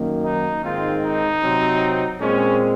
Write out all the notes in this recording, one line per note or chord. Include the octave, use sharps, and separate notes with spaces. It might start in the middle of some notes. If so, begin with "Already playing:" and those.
Already playing: F#2 D#3 A#3
D#4
G#2 D#3 G#3 C4 F4
D#4
C3 F#3 C4
A#2 G#3 C4 C#4